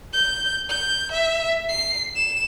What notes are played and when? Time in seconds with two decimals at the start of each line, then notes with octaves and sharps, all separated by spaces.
0.13 G6
0.69 G6
1.12 E5
1.69 C7
2.15 E7